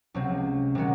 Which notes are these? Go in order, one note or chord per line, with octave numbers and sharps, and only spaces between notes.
C#2 C3 F#3 C4
C3 D#3 F#3 C#4 F#4